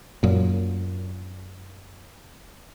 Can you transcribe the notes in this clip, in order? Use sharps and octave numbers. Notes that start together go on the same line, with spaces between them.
F#2 A#2